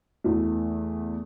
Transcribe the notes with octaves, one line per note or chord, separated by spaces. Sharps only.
E2 E3 A3